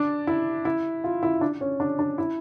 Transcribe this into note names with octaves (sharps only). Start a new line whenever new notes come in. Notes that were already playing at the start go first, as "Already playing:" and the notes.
Already playing: D4
E4
E4
F4
E4
D4
C#4
D4
D4
E4